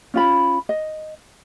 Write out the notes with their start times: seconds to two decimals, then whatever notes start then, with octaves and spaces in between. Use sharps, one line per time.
0.14 C#4 F4 B5
0.69 D#5